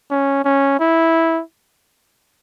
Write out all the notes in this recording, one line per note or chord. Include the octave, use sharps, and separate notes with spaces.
C#4
C#4
E4